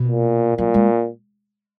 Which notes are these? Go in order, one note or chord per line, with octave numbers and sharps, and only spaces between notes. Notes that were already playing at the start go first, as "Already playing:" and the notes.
Already playing: B2
A#2
A#2 F#3
G#3